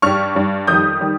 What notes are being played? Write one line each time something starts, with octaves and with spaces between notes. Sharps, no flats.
G2 G3 C#6 F6
G2 G3
F2 D#3 G3 D#6 G6
D#3 G3